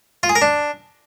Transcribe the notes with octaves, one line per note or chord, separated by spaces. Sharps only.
F4
G#4
A#4
D4